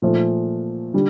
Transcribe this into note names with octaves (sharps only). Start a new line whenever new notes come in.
A#2 F3 A3
D3 G3